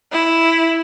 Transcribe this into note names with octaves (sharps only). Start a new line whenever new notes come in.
E4